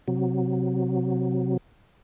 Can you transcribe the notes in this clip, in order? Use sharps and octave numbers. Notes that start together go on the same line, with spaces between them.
C3 F#3